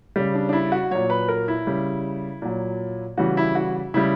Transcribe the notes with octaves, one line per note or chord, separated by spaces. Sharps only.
C#3 G3
D4
D4
E4
F#4
A#2 F#3 C#5
B4
A#4
E4
C#3 G3
A#2 F#3
C#3 E3 G3 F#4
E4
F#4
C#3 G3 E4